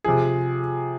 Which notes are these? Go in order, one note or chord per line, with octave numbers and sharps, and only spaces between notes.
C3 F3 G#4